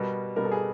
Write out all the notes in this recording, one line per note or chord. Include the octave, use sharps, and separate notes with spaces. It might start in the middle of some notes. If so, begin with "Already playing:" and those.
Already playing: B2 G3 B3 A#4
B2 G3 B3 A#4
A4
G#4